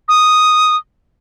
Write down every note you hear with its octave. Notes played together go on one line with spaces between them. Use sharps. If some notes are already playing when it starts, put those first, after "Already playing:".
D#6